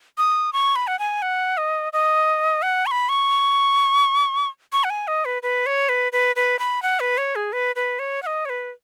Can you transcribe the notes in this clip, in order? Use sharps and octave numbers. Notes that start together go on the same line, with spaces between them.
D#6
C#6
B5
F#5
G#5
F#5
D#5
D#5
F#5
C#6
B5
C#6
C#6
F#5
G#5
D#5
B4
B4
C#5
B4
B4
B4
B5
F#5
B4
C#5
G#4
B4
B4
C#5
F#5
D#5
C#5
B4